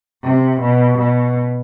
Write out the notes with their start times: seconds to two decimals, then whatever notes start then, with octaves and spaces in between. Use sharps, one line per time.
0.24 C3
0.61 B2
0.99 B2